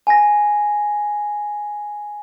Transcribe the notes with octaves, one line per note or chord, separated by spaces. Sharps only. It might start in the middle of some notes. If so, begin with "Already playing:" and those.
G#5 A#6